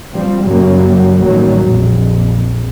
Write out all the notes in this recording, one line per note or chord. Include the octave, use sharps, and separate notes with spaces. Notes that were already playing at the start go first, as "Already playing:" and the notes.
F3 G3 C4
F#2 C#3 F#3 G3 A#3
A1 D#3 F#3 G3 A#3
A#1 F2